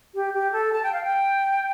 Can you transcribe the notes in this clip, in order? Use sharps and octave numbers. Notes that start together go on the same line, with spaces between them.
G4
G4
A4
A5
G5
F5
G5